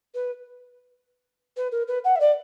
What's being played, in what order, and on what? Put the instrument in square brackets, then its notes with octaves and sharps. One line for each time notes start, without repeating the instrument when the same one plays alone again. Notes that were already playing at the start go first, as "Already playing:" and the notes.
[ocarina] B4
B4
A#4
B4
F#5
E5
D5